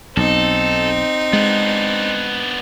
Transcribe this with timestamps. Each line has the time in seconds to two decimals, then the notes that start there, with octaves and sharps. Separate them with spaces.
0.17 B1 C4 D#4 A4
1.33 G#3 B3 D4